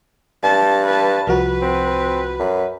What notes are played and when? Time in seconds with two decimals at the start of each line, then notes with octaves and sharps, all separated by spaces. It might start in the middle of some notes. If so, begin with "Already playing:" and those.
0.43 G2 A5
0.86 B4 A5
1.27 C2 F3 F#4 B4
1.62 C4
2.40 F#2